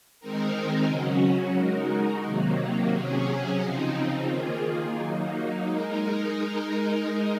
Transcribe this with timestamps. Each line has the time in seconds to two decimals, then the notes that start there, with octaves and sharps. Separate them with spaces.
0.20 D#3 G#3 C4 D#4 A#4
0.87 C#3 F#3 C#4 F#4
1.56 G#3 D#4 F#4 A#4
2.24 C3 D#3 F#3 A#3
2.91 C3 F#3 C#4 G#4
3.60 C#3 F3 C4 D#4
4.27 D#3 A#3 F4 G#4
4.95 F#3 A#3 D#4
5.64 G#3 D#4 A#4